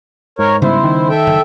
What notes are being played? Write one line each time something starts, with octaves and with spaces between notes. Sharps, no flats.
G#2 A#4 C#5
C#3 G3 B3 E4 C5
D#3
A4 E5 G5
F#1